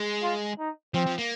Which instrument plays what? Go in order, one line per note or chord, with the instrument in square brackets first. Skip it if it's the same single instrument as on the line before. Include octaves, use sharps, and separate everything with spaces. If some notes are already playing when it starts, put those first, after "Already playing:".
Already playing: [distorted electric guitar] G#3
[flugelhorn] F4
D#4
[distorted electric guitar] F3 [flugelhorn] C4
[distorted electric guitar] F3
A#3